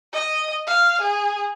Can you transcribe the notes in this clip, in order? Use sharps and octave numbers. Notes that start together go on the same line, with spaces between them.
D#5
F5
G#4